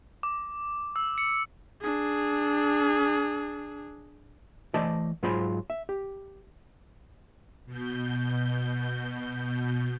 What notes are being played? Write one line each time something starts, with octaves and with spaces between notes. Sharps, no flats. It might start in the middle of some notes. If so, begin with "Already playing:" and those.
D6
E6
C#7
D4 G#4
E3 A3 C5 D5 D#5 A5
G#2 F#3 F4 G#4 C5 B5
E5
G4
B2 G6